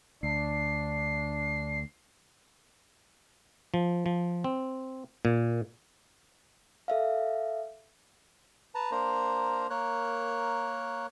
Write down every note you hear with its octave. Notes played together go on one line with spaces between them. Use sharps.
D2 D4 C7
F3
F3
C4
A#2
A4 E5 F5
B4 A5 A#5
A#3 D4 A#4 C5 A#5
A#3 A#4 C#5 F#6